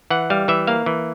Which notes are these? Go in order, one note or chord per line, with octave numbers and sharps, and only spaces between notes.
E3 F#5
G3 F5
E3 E5
A#3 F5
E3